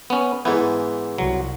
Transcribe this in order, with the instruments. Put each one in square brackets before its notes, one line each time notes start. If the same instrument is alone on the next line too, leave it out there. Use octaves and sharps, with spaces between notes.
[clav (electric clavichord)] B3 C#4
[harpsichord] G#2 E3 [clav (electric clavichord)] B3
[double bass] C2 [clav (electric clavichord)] F#3